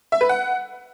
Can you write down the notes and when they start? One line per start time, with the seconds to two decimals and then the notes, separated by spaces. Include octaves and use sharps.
0.12 E5
0.21 B4
0.29 F#5